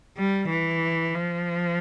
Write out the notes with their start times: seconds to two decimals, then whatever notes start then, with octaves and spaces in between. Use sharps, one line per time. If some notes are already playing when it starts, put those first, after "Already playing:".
0.17 G3
0.49 E3
1.14 F3